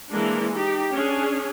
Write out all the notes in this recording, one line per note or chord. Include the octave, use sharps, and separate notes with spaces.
E3 G#3 A#3 D4
D#4 G4
C#4 D4 G#4